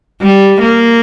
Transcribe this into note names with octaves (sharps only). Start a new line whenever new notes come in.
G3
A#3